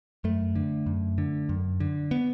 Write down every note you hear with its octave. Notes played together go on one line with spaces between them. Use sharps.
F#2 A3
D3
F#2
D3
F#2
D3
B3